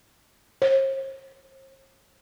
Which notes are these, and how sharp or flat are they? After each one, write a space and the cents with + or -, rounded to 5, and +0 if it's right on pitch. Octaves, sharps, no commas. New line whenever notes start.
C5 +45